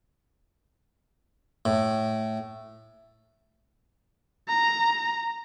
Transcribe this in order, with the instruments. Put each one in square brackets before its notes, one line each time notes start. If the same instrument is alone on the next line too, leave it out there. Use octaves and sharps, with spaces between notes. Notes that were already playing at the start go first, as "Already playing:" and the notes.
[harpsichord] A2
[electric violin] A#5